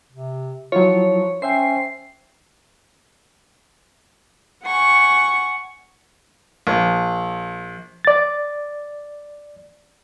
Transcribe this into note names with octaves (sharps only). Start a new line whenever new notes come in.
C3
F3 F#3 E4 F4 C#5
C#4 C5 E5 G5 C7
F#5 G#5 C#6
A#1
D5 A6